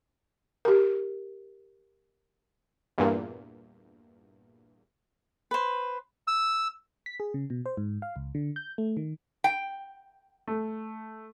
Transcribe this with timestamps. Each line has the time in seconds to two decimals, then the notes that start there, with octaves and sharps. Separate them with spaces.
0.65 G4 A#4
2.98 E2 G2 A#2
5.51 B4 C5
6.28 E6
7.06 B6
7.20 G#4
7.34 C#3
7.50 B2
7.66 C5
7.77 G#2
8.02 F5
8.16 C#2
8.35 D3
8.56 G6
8.78 A3
8.97 D#3
9.44 G5
10.47 A3